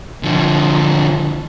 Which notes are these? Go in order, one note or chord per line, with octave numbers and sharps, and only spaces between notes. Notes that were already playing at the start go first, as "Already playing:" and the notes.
D3 F3